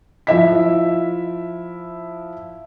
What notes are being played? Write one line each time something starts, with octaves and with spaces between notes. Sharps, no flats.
F3 E4 E5 B6